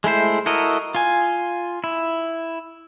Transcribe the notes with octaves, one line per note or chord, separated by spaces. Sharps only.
G#3 A3 E4 C5
E4 F#4 A4 A#4 D#5
F4 G#5
E4